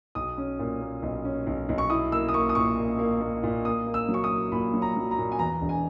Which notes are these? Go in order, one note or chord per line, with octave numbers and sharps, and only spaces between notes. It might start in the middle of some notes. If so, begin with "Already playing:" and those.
B1 D#6
C#4
A#2
A#3
B1
C#4
B1
B1
C#6
E4 D#6
A#3 E6
D#6
A#3 C#6
D#6
A#2 C#6
A#3
A#3
A#3
A#2
A#3 D#6
A#3
E6
F#3
C#6
D#6
A#3
A#2 B5
F#3
A#5
F#3
A#5
A#2
G#5
E2 A#5
E1
G#5